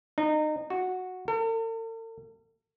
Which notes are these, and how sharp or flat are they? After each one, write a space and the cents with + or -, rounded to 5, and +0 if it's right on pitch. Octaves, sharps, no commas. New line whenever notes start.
D#4 -30
F#4 -5
A4 +45